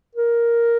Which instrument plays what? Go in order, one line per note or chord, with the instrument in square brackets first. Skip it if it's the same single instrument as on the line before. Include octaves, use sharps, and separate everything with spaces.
[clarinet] A#4